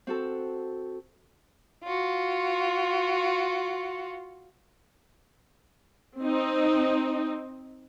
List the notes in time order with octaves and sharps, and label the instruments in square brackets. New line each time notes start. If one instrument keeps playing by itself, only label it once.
[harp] C4 F#4 A4
[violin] F4 F#4
[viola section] C4 D#4